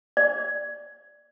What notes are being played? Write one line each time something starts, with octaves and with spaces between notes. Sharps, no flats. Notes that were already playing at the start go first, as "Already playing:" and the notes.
D5